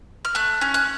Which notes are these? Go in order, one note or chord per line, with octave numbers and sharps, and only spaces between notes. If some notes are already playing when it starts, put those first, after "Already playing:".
F6
A3 F#6
C#4
F#6